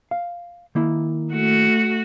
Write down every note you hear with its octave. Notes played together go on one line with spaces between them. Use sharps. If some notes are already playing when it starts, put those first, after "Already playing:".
F5
D#3 A#3 E4
A3 F#4